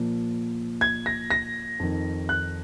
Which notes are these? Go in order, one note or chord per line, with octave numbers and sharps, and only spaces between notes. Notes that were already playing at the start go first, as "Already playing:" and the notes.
Already playing: A#2 F3
G#6
A#6
A#6
F2 D#3
F#6